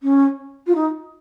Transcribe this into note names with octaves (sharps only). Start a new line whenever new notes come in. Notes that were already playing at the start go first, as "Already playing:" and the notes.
C#4
F4
D#4